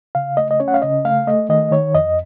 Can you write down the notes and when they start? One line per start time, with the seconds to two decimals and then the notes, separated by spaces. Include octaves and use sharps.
0.15 C#3 F5
0.37 A3 D#5
0.51 D#5
0.60 C#4 C#5
0.68 F#5
0.74 F5
0.82 C#3 D#5
1.05 A3 F5
1.27 A3 D#5
1.49 D#3 D#5
1.71 D#3 C#5
1.95 F2 D#5